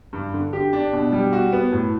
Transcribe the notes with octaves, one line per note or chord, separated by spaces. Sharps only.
G2
D3
G4
D4
B2
G3
F#4
B3
A2